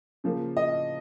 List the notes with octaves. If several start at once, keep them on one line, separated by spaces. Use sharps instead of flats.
C#3 F3 A#3
D#5